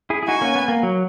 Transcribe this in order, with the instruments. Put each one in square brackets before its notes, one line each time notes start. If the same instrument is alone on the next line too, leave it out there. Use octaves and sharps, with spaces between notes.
[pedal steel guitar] E4 G#4
G#4
[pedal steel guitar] D#4 F#4 [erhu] G#5
[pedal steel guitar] A#3 C#4
B3
A#3
F#3